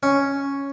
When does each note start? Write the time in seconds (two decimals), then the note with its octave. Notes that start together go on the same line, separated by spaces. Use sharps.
0.03 C#4